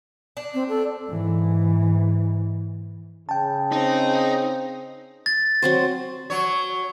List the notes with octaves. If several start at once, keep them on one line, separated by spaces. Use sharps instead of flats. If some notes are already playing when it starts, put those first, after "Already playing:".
D4
C4
A4
G#2 E3
C#3 G5 A5
C4 D#4
A6
F#3 C4 C5
F#3 C#5